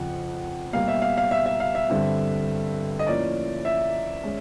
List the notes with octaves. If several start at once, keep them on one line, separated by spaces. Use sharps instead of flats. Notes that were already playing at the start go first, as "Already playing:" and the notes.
Already playing: F2 C#3 F3 F#5
B2 G3 A#3 F5
E5
F5
F5
E5
E5
F5
E5
G2 D3 G3 C4
D#5
A2 F3 A#3 C#4 D5
E5
G#3 C#4